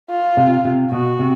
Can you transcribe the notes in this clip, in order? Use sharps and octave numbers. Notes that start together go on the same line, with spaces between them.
F4
C3
C3
B2 F#4
C3